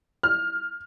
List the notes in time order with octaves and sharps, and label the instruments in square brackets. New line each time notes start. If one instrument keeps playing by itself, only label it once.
[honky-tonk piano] F6